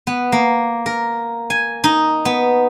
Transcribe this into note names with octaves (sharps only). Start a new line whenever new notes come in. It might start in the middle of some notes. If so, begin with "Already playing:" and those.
B3
A#3
A#4
G#5
D#4
B3